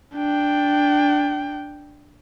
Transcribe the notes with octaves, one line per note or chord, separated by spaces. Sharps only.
D4 G5